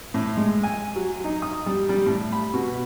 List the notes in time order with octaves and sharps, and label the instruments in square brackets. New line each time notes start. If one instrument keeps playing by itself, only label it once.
[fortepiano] A2
G#3
G#5
F#3
D#4
D#6
G3
G3
A2
B5
B2